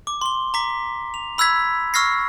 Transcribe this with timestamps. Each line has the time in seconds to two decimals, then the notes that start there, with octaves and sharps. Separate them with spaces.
0.07 D6
0.21 C6 G7
0.54 A#5 D6 B6
1.14 F7
1.38 B5 E6 F#6 G#6 B6
1.94 C#6 E6 F6 G#6 A#6 C7